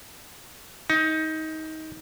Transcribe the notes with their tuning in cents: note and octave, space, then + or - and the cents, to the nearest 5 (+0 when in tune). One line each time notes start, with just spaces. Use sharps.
D#4 +20